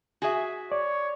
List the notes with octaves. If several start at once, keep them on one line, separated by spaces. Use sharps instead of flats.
F#4 G#4 E5 G#5
C#5 D5